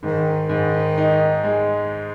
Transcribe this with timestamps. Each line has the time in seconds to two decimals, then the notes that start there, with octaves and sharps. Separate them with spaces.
0.03 G#2 D#3
0.49 G#2
0.97 D#4
1.44 G#3